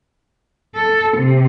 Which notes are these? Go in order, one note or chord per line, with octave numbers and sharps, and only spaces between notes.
A4
C3